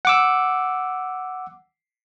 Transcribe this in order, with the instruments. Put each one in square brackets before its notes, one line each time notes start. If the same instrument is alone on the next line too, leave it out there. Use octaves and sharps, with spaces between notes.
[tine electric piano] F#5 D6 E6